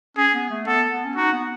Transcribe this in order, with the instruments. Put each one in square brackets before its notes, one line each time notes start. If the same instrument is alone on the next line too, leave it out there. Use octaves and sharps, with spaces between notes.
[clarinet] C#4 [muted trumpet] G#4
[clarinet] B3
A3
[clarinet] B3 [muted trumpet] A4
[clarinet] B3
C#4
[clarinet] D#4 [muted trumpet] F#4
[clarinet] B3